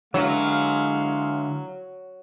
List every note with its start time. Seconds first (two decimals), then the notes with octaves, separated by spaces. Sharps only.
0.14 D3 F#3 G#3 E4 B4 F5